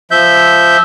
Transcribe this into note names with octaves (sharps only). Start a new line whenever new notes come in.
F3 E5 G6